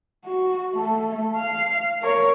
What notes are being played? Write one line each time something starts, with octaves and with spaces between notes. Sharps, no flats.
F#4
A3 A4
F5
A#4 C#5